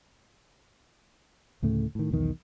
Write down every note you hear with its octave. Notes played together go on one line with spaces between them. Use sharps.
D2 A2 C#3 A3
A2 D#3
B1 E2 D#3